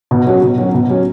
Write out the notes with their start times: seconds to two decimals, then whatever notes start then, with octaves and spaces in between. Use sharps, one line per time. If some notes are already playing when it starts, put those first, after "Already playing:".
0.11 B2
0.26 F#3 C#4 F#4
0.43 B2
0.58 F#3 C#4 F#4
0.74 B2
0.90 F#3 C#4 F#4